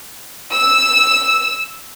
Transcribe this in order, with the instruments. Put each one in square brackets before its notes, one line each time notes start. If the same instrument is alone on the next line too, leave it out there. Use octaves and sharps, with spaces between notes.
[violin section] E6